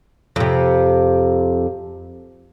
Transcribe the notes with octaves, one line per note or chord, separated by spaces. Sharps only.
F2 C3